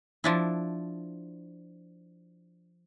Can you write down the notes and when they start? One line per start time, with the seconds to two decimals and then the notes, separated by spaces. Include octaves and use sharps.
0.24 F3 D4 E4